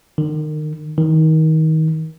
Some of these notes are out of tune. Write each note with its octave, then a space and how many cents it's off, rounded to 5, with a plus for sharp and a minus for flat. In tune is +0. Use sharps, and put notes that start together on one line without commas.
D#3 -30
D#3 +25